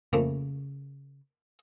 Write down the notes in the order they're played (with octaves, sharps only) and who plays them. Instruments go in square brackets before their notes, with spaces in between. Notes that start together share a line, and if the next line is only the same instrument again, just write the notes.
[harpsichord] F2 A3 A#3 [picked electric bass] C#3